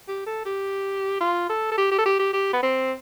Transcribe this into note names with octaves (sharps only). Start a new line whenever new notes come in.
G4
A4
G4
F4
A4
A4
G4
G4
A4
G4
G4
G4
B3
C4